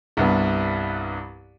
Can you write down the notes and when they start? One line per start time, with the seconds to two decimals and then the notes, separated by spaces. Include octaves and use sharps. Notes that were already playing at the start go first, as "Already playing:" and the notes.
0.17 C2 G2 B3